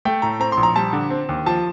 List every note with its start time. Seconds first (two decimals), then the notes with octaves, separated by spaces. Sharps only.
0.05 A3 G5
0.22 A2 A#5
0.40 C4 A#5
0.52 A#1 C6
0.63 A#5
0.76 G3 A5
0.93 D3
1.10 C4
1.29 D#2
1.46 F3 A5